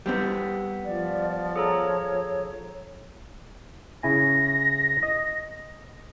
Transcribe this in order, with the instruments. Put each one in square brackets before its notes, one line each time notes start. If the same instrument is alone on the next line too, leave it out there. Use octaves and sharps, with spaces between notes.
[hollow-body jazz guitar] G3 B3 C4
[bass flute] F3 [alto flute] D5
[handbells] G#4 A4 A#5 [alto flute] C#5
[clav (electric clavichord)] C#3 E4 G#5 [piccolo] A#6
[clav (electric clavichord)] D#5